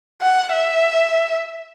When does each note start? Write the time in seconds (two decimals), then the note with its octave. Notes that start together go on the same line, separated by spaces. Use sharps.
0.22 F#5
0.52 E5